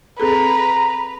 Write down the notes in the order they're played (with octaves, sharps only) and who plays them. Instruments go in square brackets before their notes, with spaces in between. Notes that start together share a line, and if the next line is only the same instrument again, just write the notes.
[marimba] C4 G#4 A4 [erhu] B4 [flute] A#5